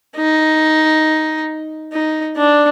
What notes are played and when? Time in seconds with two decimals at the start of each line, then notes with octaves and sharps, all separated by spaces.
0.16 D#4
1.93 D#4
2.37 D4